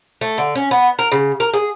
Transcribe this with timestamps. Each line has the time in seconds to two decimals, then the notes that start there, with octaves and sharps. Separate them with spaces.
0.21 A3
0.38 D3
0.55 C#4
0.71 B3
0.99 A#4
1.12 C#3
1.40 A#4
1.53 G#4